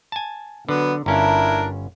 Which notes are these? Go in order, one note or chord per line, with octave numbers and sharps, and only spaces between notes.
G#5 A5
D3 F#3 B3
G1 C#4 D4 E4 A#4 F5